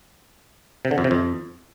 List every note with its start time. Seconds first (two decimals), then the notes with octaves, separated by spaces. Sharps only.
0.85 C3
0.91 D3
0.98 F2
1.04 C3
1.11 F2